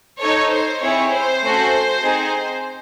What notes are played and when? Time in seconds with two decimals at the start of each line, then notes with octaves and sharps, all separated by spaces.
0.22 D#4 A4 C#5
0.53 C5
0.83 C4 E4 G#4 C#5
1.12 C5
1.44 A3 C#4 F#4 A4
2.03 C4 D#4 G#4